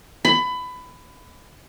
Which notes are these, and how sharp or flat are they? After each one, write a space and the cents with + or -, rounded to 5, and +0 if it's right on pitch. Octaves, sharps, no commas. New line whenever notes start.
B5 +20